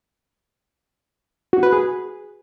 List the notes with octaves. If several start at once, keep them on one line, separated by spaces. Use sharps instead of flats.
F#4
B4
G#4